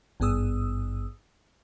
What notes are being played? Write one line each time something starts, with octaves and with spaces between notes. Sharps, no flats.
G#1 G2 B3 G#4 D#6 E6